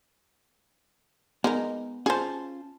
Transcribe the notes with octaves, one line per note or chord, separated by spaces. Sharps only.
G#3 B3 D#4 A#4
C#4 F4 G#4 C5 A5